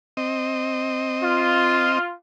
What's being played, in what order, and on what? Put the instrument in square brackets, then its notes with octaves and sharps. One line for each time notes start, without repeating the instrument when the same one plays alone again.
[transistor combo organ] C4 D#5
[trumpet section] F4